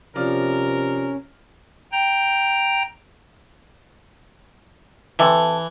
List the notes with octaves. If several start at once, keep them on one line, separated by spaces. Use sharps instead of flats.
C3 F3 C#4 A#4 D5 F6
G5 A#5 G6
C3 E3 E4 A4